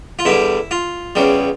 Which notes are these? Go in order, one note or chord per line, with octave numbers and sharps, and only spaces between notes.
F4
E2 D3 G3 E4
F4
E2 C#3 G3